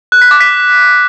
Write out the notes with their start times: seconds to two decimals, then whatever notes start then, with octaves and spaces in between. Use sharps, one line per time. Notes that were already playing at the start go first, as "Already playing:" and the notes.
0.12 F#6
0.22 B6
0.31 D6
0.40 B6